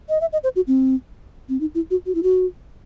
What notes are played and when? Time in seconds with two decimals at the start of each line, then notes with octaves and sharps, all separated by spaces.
0.09 D#5
0.21 E5
0.33 D#5
0.44 C5
0.56 F#4
0.67 C4
1.49 C4
1.60 D#4
1.75 E4
1.91 F#4
2.06 F#4
2.15 E4
2.23 F#4